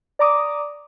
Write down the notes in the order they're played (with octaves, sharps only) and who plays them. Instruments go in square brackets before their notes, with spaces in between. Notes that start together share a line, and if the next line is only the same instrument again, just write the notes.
[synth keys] D5 A#5 D6 D#6